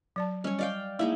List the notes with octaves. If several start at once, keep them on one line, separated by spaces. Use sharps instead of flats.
F#3 D5 A5
G3 C#4 C#5
D5 D#5 F5 G5
G#3 A#3 D#4 E4